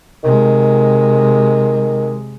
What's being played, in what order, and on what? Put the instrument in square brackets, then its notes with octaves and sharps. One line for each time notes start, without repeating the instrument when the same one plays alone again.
[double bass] C3 G#3 [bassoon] D#3